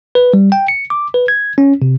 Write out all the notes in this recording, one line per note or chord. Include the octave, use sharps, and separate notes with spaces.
B4
G3
G5
C#7
D6
B4
G#6
C#4
C3